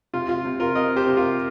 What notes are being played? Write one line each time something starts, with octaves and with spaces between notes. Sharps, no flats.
C3 F4
F4
C3
F4 A#4
C4 A#4 D#5
G4 C5
C3
F4 A#4